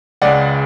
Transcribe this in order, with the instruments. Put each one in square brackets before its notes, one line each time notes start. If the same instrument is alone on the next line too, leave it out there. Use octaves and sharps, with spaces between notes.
[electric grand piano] C#2 C#3 G#3 [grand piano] D5 F#5